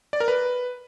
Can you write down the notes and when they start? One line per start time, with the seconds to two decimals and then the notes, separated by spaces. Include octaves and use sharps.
0.13 D5
0.20 A#4
0.28 B4